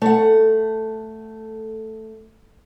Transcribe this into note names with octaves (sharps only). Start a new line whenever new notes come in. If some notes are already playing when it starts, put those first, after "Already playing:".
A3 F#5